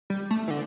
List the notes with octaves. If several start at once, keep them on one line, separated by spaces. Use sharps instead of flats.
G3
A3
E3
D3